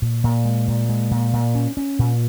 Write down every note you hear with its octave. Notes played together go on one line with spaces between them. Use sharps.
A#2
A#2
G#3
A#2
G#3
A#2
A#2
C#4
C#4
A#2